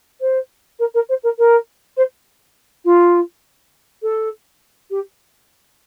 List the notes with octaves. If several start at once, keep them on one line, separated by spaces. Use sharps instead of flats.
C5
A#4
A#4
C5
A#4
A#4
C5
F4
A4
G4